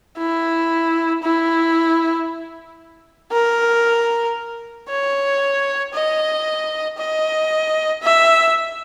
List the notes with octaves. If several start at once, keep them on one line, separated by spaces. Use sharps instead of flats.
E4
E4
A#4
C#5
D#5
D#5
E5